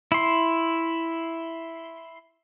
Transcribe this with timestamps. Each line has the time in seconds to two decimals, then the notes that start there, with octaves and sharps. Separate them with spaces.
0.12 E4 C6